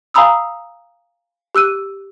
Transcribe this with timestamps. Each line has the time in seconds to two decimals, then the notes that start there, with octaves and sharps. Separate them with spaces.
0.14 F5 G#5 A#5 B5 D#6 E6
1.55 G4 E6 F#6 D#7